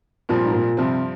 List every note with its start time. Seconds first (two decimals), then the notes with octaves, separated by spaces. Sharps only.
0.29 G2 A#2 F3 C4
0.45 G#2
0.53 A#2
0.77 G2 C3 F3 C4